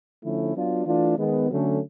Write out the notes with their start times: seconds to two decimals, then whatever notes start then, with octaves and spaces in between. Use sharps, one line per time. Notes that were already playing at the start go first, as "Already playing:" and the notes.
0.23 D3 F3 A3 C#4 E4
0.54 F#3 B3 D4 F4
0.85 E3 A3 D4 F4
1.17 D#3 G#3 B3
1.48 D3 F#3 A3 C#4